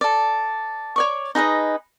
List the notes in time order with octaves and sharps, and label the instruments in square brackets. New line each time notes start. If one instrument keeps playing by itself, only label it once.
[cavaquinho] A4 D5
C#5 D5 C#6
D#4 G#4 B4 D#5